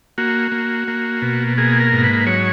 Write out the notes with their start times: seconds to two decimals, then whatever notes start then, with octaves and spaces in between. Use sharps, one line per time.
0.18 A#3 F#4
0.52 A#3
0.88 A#3
1.22 B2
1.58 A#3 G#4
1.80 A#4
1.92 G#2
2.04 B4
2.27 F#3 C#5